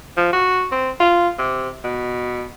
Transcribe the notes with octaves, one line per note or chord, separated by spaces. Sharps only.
F3
F#4
C4
F4
C3
B2